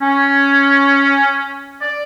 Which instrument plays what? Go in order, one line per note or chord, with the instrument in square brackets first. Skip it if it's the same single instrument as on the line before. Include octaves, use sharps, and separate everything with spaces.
[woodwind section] C#4
D5